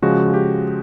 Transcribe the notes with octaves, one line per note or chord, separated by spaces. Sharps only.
C#3 F3 G#3 F#4
G4